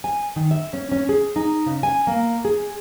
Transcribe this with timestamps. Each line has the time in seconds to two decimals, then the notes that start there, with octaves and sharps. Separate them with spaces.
0.04 G#5
0.36 D#3
0.51 E5
0.73 C#4
0.92 C#4
1.09 G#4
1.36 D#4
1.66 C#3
1.83 G#5
2.07 A#3
2.45 G#4